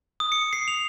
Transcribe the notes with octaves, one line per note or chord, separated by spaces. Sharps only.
D#6
C#7
C7
F7